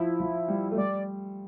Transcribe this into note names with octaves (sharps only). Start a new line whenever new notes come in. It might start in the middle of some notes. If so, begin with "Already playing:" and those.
Already playing: F3 E4
F3
G3
A3
G3 D5